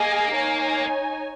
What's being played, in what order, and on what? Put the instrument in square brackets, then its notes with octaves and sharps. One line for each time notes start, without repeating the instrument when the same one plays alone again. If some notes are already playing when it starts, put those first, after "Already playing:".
Already playing: [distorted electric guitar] A#3 [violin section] G#4 D#5 G#5
[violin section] D#4 C#5 G#5